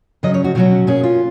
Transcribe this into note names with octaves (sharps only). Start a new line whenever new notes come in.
C#3 F#3 C#4 D#5
C#5
F#4
B2 F#3 C#4 F#4
B2 A#3 C#4 G#4
F4